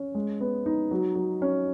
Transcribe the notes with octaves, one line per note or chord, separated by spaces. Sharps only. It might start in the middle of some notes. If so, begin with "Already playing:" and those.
Already playing: C#4
G#3
B3
D#4
F#3
F#3
C#4